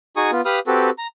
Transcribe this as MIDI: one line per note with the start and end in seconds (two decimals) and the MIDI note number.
0.17 0.31 63
0.17 0.31 66
0.17 0.31 68
0.17 0.31 80
0.17 0.31 85
0.17 0.31 87
0.32 0.41 59
0.32 0.41 65
0.45 0.59 67
0.45 0.59 71
0.45 0.59 77
0.45 0.59 83
0.45 0.59 87
0.45 0.59 89
0.67 0.90 60
0.67 0.90 66
0.67 0.90 67
0.67 0.90 69
0.67 0.90 71
0.98 1.07 82